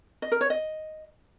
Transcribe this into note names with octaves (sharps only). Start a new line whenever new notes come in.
D#5
A#4
C#5
D#5